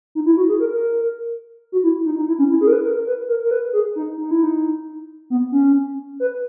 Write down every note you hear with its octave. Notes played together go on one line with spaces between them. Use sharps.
D#4
E4
F#4
G#4
A#4
A#4
F#4
E4
D#4
D#4
E4
C#4
E4
G#4
A#4
B4
A#4
A#4
B4
A#4
A#4
B4
G#4
D#4
D#4
E4
D#4
B3
C#4
B4